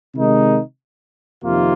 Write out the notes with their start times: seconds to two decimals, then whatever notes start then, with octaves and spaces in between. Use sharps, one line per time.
0.15 C3 D#3 G#3 D#4
1.43 F2 C3 D#3 A#3 F4